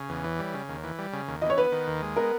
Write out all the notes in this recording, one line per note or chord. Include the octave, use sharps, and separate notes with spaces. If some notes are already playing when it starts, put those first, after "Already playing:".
Already playing: C#3 C#5
E2
E3
G3
C#3
D#2
E3
G3
C#3
D#2
E3 D#5
C#5
B3 B4
D#3
D#2
G#3
B3 A#4